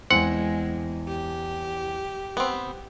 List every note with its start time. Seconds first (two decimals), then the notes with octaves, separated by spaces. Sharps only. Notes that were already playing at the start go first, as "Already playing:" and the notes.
0.11 E2 G#3 C4 F#5 G#5
1.07 G4
2.37 B3 C4